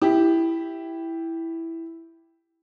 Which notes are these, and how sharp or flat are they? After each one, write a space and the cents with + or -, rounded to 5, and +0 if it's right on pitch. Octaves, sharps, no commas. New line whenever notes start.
E4 +0 G4 +0